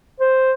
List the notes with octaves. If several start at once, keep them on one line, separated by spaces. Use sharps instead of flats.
C5